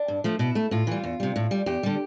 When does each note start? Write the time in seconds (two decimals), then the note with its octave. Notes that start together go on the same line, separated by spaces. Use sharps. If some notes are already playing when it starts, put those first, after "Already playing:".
Already playing: D4
0.08 G2
0.24 F3 A3
0.39 B2 E4
0.55 A3
0.71 A2 F4
0.87 E3 G3
1.04 E2
1.20 C3 G3
1.36 A2
1.51 G3
1.66 E2 G4
1.83 D3 G3